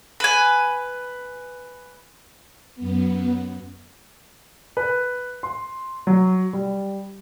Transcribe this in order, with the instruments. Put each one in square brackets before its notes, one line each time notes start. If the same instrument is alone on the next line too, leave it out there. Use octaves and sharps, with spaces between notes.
[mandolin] B4 G#5
[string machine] F#2 B3
[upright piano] B4
C6
F#3
G3